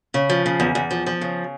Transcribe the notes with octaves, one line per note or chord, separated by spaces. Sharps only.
C#3
F3
C#3
E2
E2
F3
F3
C#3